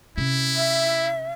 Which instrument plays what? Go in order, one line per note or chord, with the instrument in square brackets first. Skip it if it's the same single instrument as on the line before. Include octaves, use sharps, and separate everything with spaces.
[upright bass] C3 C#4 [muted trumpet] E4
[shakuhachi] E5